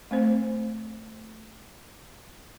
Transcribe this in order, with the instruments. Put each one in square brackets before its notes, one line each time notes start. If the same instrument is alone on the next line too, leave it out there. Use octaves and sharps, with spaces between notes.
[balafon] A3 C4 C5